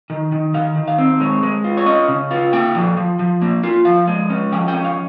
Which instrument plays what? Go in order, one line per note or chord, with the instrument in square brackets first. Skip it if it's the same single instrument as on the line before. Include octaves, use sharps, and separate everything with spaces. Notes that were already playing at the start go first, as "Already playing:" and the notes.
[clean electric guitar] D#3
D#3
D#3 F5
D#3
F5
C4
G#3 C#5
G#3
F4
C#5
C#4 D#5
C#3
F4
A#3 G5
F3
F3
F3
A#3
F4
F3 F5
G#3
C#4
F3 G5
G5
C#4
F5